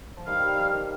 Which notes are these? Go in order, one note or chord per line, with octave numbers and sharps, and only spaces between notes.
F3
D#3 G3 F5
D#3 G3
F3
D#3